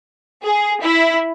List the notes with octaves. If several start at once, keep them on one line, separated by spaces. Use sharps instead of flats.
G#4
E4